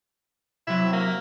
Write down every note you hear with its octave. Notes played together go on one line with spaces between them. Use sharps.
C3 F#3 E4
A#3